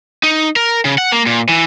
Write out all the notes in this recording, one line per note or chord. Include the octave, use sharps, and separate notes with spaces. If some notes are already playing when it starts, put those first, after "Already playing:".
D#4
A#4
C#3
F#5
A#3
A#2
E3